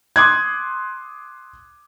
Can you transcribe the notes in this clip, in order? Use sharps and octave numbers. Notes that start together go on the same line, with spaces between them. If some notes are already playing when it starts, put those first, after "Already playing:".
C6 D6 D#6 F#6 G#6